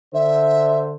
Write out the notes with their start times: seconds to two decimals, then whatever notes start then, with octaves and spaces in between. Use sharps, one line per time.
0.14 D3 C5 E5